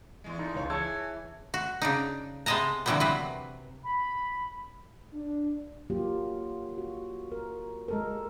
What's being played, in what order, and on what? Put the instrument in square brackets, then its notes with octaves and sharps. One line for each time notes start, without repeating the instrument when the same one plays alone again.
[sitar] E2 G#3
[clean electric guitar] D#4 A4
[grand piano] C#2 C#5
[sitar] E3 [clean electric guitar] G#4 C#5 [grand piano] A5 E6 G#6
[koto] F#4
C#3 D4 D#4
C3 G#3 B3 D#5 A5 A#5
A#2 D3 E3 F#3 G3 B3
C3 F#3 B4
[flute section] B5
[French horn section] D4
[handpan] F#3 A#3 F4 G4
F#4
A#4
G#3 A4 A#4